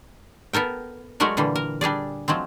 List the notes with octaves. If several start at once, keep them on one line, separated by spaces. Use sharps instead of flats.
B3 A4 A#4 G5
F#3 G#3 A3 F#4 A#4 D5
A#2 D3 E3 G3
A#4
G3 D4 G#4 D5
F3 F#3 G#3 C4